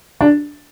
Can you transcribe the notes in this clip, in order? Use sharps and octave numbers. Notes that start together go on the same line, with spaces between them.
D4